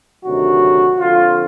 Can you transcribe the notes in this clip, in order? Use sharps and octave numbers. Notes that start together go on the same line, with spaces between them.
D2 C3 D#3 F#3 F#4
F2 D3 F3 F4